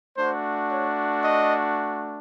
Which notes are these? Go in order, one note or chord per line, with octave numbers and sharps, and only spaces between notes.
A3 D4 F#4 C5
C#5
D#5